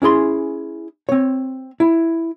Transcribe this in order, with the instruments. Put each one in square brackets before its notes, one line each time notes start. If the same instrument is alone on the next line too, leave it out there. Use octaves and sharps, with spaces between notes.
[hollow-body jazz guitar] C#4 E4 G#4 C6
C4 C#5
E4